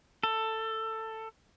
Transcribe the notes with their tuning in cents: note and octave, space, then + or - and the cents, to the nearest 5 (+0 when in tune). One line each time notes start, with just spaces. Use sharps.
A4 +15